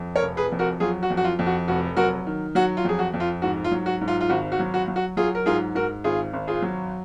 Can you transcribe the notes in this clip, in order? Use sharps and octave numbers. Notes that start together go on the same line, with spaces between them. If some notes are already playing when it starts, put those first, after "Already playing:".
Already playing: F2
A#4 C#5
F1
G#4 B4
F2
F#4 A#4
F#3 F4 G#4
F#4
F2
F#4
F4
F2
F#4
F1 F#4
F#3 F#4 A#4
D#3
F#3 F#4
F4
F2 G#4
F#4
F2
F4
G#2 F#4
F4
F#3
F#4
G#2
F4
F4
G#1 F#4
F#4
F#3
F#4
F#3
F#4
F#3 F4 G#4
A#4
G#2 F4 G#4
G#2 F#4 A#4
G#1 F4 G#4
G#1
F4 G#4
F#3